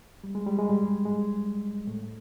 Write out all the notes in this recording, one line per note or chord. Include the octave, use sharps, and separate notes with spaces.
G3
G#3
G3
G#3
G2 G3
G#2 G#3
A2 A3